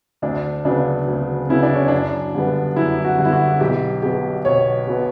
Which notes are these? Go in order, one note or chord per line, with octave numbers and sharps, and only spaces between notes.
D2 D4
C#3 F#3 B3 D4
D2
C#3 F#3 B3 E4
D4
C#4
F#2 D4
D3 G3 B3
F#2 E4
F#4
D3 G3 B3
E4
F#4
B1 G4
B2 F#3 B3 G4
B1 C#5
B2 F#3 B3